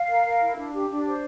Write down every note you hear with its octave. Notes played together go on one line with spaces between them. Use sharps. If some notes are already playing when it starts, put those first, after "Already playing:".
Already playing: F5
A#4
A#4
E4
D4
G4
D4
C5